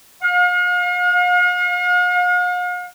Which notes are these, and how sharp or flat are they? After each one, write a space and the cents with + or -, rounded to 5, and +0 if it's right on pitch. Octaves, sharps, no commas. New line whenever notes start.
F5 +45